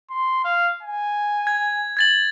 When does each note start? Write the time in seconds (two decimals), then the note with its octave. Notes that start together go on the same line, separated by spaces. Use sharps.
0.11 C6
0.44 F5
0.83 G#5
1.47 G#6
1.97 G#6 A6 F#7